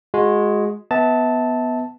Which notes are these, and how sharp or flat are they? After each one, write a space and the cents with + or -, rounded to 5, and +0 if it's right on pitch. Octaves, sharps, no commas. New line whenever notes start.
G#3 +0 F#4 -25
B3 +0 E5 -35 A5 +0